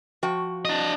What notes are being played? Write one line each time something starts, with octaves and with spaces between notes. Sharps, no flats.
F3 F#4 G5
D4 D#5